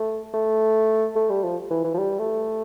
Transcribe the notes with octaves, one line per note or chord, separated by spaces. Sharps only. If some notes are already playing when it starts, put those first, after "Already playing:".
Already playing: A3
A3
A3
G3
F3
E3
E3
F3
G3
A3